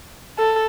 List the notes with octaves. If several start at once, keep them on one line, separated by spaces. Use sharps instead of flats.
A4